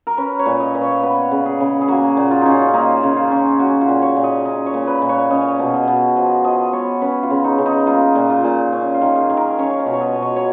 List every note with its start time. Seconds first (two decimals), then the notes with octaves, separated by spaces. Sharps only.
0.07 A#4
0.17 C#4 B4
0.39 C#5
0.46 A#2
0.60 D#5
0.74 A#2 B4
0.81 C#5
1.03 B3 B4
1.31 C#3
1.46 G#4
1.60 C#3
1.81 G#4
1.88 A#3 F#4
2.17 A#2
2.31 F4
2.41 C#4 D#4
2.51 F4
2.73 A#3 D#4
3.03 C#3
3.17 F4
3.31 C#4
3.59 C#4 F#4
3.81 F4
3.88 A#2
4.02 C#5
4.16 A#2
4.24 D#5
4.45 C#4 D#5
4.66 C#5
4.74 A#2
4.87 B4
5.02 A#2
5.09 C#5
5.31 C#4 D#5
5.59 B2
5.74 D#5
5.88 B2
6.16 F3 D#5
6.44 F3 D#5
6.73 B3 C#5
7.02 C#4 B4
7.23 F4
7.30 C#3
7.44 D#4
7.58 C#3
7.66 D#4
7.87 A#3 F4
8.15 A#2
8.30 F4
8.44 A#2
8.72 C#4
8.94 F4
9.02 D#3
9.16 G#4
9.30 D#3
9.37 A#4
9.58 C#4 C#5
9.79 C#5
9.86 B2
9.93 C#5
10.01 D#5
10.16 B2
10.22 C#5
10.36 C#5